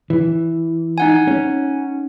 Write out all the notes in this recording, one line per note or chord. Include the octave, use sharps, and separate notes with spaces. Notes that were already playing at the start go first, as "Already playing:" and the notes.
E3
D#4 F#5 G#5
C#4